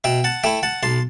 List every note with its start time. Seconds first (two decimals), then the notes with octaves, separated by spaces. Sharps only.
0.04 B2 E5 G5
0.24 F#5 A5
0.44 A3 E4 E5 G5
0.63 F#5 A5
0.83 B1 A5 C6